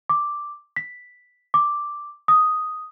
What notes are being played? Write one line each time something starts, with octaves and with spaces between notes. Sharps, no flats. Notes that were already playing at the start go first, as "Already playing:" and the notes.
D6
B6
D6
D#6